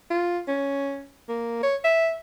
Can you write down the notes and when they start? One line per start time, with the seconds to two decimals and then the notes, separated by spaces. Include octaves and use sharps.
0.10 F4
0.48 C#4
1.29 A#3
1.63 C#5
1.84 E5